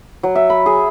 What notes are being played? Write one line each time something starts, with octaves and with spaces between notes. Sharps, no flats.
F#3
E5
B5
G#4